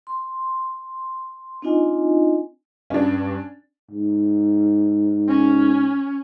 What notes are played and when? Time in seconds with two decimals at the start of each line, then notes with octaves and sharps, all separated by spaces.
0.07 C6
1.62 C4 D4 D#4 F4 D#5 G#5
2.90 G2 C#4 D4
3.91 G#2
5.28 C#4